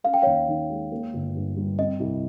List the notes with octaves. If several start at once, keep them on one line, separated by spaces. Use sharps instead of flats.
C#4 F5
G5
D#2 C#5 F5
D#3
G#3
A#3
G1
G2
G3
C4 D#5
C2